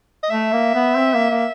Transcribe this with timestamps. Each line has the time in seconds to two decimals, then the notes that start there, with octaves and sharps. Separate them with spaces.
0.23 D#5
0.30 A3 E5
0.52 A#3
0.74 B3
0.97 C4
1.14 A#3
1.30 A#3